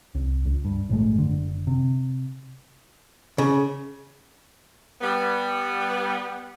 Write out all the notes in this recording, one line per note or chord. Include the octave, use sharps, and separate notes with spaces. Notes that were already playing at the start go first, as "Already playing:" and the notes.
C2
C#2
G2
A#1 G#2 G#3 A3
F#1 D3
C3
C#3
G3 B3